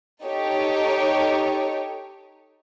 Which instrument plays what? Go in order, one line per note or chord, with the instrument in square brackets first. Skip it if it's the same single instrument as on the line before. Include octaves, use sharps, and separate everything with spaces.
[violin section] D#4 G4 A4 C#5